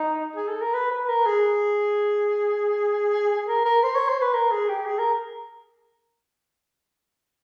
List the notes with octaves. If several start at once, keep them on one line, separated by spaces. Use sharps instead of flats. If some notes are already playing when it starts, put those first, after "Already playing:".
Already playing: D#4
G#4
A4
A#4
B4
B4
A#4
G#4
A#4
A#4
C5
C#5
C5
B4
A#4
G#4
G4
G#4
A#4